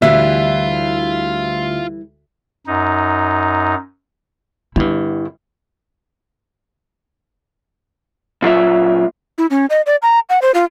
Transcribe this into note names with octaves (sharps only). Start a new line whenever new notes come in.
D2 E3 G3 F4 E5 F5
F#2 D#4
G1 G2 E4
A#2 F#3 F4 E5
E4
C#4
D#5
D5
A#5
F#5
C5
F4